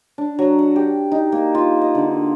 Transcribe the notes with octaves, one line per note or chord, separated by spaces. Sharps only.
D4
F#3
F#5
G4
D#4
A#3
F4
D#5
D3